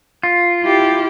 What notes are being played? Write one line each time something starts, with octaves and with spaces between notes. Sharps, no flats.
F4
E4 G4